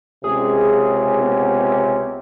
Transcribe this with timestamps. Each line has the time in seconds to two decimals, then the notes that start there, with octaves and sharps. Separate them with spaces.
0.24 C#2 C3 C#4 G#4
1.21 B3